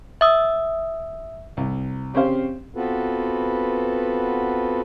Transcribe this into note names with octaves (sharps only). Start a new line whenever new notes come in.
E5 D#6 E6
C2
C#3 C4 C#4 G4 C5 F5
B3 C4 F4 F#4 A4 B4